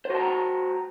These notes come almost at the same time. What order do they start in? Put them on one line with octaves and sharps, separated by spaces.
C5 F#4 A5 A#5